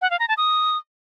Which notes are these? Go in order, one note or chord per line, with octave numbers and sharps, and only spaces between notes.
F#5
F5
A#5
A5
D#6